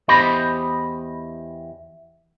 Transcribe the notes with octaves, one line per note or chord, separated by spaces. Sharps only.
E2 G4 C5 D#5 B5